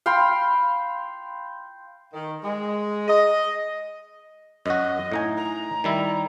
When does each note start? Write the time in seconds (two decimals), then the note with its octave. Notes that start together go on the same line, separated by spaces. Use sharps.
0.06 F5 G5 B5 C6
2.13 D#3
2.44 G#3
3.08 D#5
4.66 F#2 F#4 D#5
5.12 A2 D#4 G#5
5.37 A#5
5.84 D#3 G3 E4